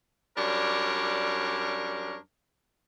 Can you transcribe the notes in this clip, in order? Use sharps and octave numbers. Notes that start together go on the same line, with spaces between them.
F#2 G3 D4 A#4 C#5